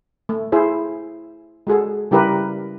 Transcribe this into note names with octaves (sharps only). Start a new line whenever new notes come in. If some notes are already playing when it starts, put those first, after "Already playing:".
A3
E4 G#4 C5
G#3 F#4 G#4 A4
C#3 G3 E4 G4 A#4 B4